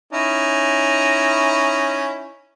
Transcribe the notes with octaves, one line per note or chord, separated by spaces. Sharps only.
C#4 D#4 E4